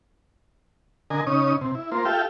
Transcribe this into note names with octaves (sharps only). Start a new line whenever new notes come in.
D3 A#4 D#5 G#5
C#3 C#4 D#4 D#6
C3
E4
A#3 F4 C5
F4 G4 A4 E5 F5 G5